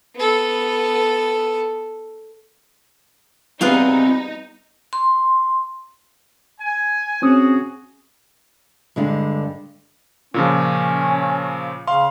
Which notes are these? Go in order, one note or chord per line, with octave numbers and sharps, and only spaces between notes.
B3 A4
G3 B3 C4 D#4 F4 G#4 B4 E5
C6
G#5
C4 C#4 F#4 G#4 D#6
G2 D3 G#3
A#2 C#3 F3 C#4
C#3 F5 C6